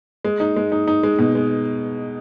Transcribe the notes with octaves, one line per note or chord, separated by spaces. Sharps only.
G#3
D#4
G#3
D#4
D#4
G#3
B2
G#3